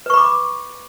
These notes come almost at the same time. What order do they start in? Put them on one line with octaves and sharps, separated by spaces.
B4 C#6 B5 D6